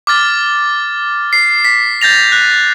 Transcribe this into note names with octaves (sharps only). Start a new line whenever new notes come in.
D6 F6 A6
C7
B6
G6 A6 A#6 F7
F#6